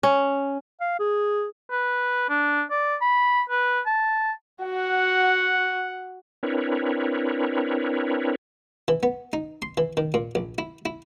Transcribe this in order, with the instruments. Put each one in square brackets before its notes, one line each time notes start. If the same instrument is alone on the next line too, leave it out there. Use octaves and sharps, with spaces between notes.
[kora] C#4
[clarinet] F5
G#4
[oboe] B4
D4
D5
B5
B4
A5
[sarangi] F#4 [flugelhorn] F#5
[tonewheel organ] C4 D4 E4 A#4 B4 C#5
[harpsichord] E3
B3
D#4
C6
E3
D#3
A#2
A#1
E4
E4